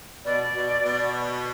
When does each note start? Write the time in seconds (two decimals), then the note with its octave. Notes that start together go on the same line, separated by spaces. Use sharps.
0.24 B2 D5
0.55 B2
0.85 B2